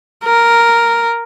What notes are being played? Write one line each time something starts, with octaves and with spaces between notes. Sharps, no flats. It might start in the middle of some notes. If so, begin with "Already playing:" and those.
A#4